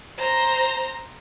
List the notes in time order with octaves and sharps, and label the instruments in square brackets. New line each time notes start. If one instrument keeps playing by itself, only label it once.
[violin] C5 A#5